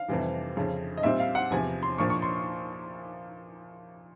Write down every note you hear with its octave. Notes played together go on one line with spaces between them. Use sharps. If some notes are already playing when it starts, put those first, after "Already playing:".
Already playing: F5
F2 C3 E3 G3
F2 C#3 F3
D#5
A#2 G3 C4 E5
F5
F#5
E2 C3 F3 G#5
C6
A#2 F3 A#3 D4 C#6
C#6
C6